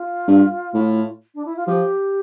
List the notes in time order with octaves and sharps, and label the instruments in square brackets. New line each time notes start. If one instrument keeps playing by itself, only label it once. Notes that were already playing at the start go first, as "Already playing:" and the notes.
Already playing: [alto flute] F4
[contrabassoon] G2
A2
[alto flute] D4
E4
F4
[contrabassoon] F3 [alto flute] G4